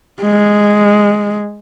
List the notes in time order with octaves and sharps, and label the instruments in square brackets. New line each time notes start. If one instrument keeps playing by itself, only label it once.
[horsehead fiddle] G#3